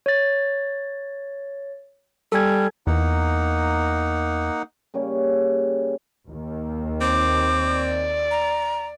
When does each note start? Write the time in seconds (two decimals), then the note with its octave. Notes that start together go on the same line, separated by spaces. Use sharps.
0.06 C#5 A6
2.32 G3 A4 G#5 G#6
2.87 E2 A#3 D#4 F#5
4.94 C#3 G3 A#3 C#4
6.29 D#2
7.01 C4 D6
7.69 D5
8.31 A#5